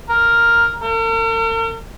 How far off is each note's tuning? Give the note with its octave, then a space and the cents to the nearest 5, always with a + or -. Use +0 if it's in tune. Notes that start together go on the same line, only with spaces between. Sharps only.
A#4 +5
A#4 -45